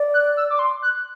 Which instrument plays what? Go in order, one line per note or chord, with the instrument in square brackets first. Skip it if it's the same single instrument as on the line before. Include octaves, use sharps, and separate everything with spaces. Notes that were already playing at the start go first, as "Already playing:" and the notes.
Already playing: [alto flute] D5
[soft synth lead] F#6
E6
D6
C6
F#6